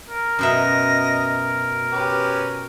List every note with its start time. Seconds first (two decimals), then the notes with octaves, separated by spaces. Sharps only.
0.10 A#4
0.39 F#2 B2 D#5 E5
1.92 C#4 G4 B4